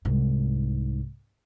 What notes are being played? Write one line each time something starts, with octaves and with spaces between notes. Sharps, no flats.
C2 G#2